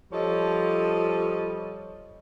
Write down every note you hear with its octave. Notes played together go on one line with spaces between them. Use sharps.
F3 G3 A4 C#5 D#5